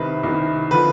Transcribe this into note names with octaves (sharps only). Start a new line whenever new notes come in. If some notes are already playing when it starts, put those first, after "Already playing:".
Already playing: C2 C3 D#3 B4
C2 C3 D#3
D3 F3 B4